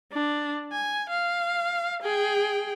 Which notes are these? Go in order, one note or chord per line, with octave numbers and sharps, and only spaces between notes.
D4
G#5
F5
G#4 G5